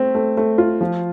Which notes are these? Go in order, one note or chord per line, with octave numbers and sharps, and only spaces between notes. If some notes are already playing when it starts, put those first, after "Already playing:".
Already playing: A3 C4
A3
A3
F4
F3